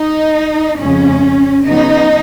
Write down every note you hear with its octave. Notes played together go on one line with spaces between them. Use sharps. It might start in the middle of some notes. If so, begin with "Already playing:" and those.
Already playing: D#4
F2 C#3 G#3 C#4
C#3 F#3 B3 D#4